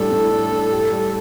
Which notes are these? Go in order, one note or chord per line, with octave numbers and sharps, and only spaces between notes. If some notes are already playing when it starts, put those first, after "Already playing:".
Already playing: A2 G3 D4 A4
A2
D4
A2
G4
G3